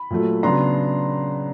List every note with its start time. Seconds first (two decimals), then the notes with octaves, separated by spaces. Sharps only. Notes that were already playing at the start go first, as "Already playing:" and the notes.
Already playing: B5
0.10 A#2 F#3 A3
0.43 C#3 F#3 B3 D4 A#5 C6